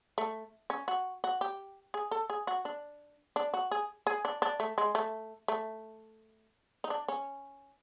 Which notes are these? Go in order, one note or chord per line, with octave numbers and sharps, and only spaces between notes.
A3
C#4
F#4
F#4
G4
G#4
A4
G#4
F#4
D4
D4
F#4
G#4
G#4
D4
D4
A3
G#3
A3
A3
D#4
D4
C#4